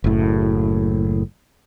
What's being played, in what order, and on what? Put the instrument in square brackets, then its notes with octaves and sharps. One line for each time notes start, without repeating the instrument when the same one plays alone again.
[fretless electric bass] F#1 A2